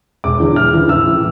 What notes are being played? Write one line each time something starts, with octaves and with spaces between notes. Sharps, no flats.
E1 D6
E2 D3
E1 F6
D2 C#3 E3
A1 E6
A2 E3